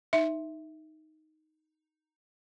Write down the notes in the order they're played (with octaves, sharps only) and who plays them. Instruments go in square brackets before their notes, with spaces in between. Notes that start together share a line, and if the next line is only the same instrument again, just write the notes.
[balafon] D#4 E5